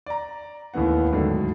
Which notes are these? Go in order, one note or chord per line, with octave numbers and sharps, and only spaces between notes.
D5 A#5
D#2 A2 E3 B3 F#5
D2 G#2 D3 D#3 F#3